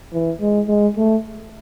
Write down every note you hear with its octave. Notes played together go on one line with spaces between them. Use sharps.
E3
G#3
G#3
A3